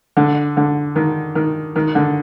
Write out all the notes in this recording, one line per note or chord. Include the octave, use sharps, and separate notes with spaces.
D3
D3
D#3
D#3
D#3
D3